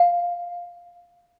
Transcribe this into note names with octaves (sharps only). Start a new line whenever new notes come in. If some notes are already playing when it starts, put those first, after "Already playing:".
Already playing: F5